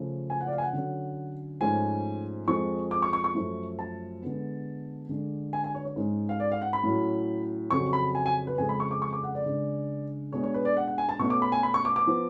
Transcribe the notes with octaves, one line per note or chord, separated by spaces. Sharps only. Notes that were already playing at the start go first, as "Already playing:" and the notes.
Already playing: C#3 F3 A3 C#4
G#5
F#5
D5
F5
G#5
F#5
D3 F#3 C#4
G#2 F3 A3 C#4 G#5
F2 F3 G#3 C#6
D6
C#6
C#6
C#6
F#2 F3 A3
A5
D3 G#3 B3
D3 G#3 D4
G#5
G#5
C#5
C#5
G#2 G#3 C#4
F5
D5
F5
F#5
B5
A2 F#3 C#4
F2 C#3 F#3 C#6
B5
G#5
G#5
B4
F2 C#3 G#3 G#5
B5
C#6
D6
C#6
D6
F#5
D5
C#3 G#3 D4
B2 G#3 D4 C#5
C#5
B4
D5
F#5
F#5
G#5
A5
B2 A3 C#4 C#6
D6
B5
G#5
B5
C#6
D6
D6
F3 B3